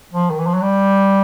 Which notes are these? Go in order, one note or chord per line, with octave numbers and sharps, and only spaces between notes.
F3
D#3
E3
F3
F#3
G3